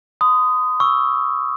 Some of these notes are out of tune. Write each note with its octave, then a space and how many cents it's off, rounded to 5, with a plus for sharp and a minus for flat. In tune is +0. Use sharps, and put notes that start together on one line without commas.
C6 -45 D#6 +0
C#6 +10 E6 +0